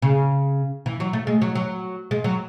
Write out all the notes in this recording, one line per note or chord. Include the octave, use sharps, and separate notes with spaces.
C#3
E3
F#3
A3
G#3
F#3
F#3
G#3
F#3